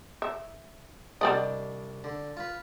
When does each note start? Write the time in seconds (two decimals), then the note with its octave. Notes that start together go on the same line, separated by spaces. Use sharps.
0.22 E5
1.21 C2 G3 D4 D5 D#5
2.04 D3
2.37 F4 B4